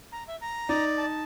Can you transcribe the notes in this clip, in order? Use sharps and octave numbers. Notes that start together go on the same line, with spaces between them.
A#5
E5
A#5
D#4 D5
A5